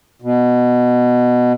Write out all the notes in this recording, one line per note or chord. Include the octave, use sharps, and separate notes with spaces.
B2